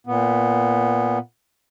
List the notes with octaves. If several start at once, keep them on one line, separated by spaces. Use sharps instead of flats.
A#2 B3